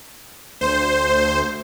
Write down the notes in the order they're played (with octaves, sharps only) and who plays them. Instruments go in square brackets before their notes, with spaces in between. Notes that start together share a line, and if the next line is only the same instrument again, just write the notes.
[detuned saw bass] D2 [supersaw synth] C5